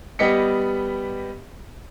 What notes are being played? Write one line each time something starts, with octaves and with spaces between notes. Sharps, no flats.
G3 B3 G4 D#5 B6 C#7